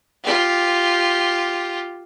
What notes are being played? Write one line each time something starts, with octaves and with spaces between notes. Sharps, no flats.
F4 G4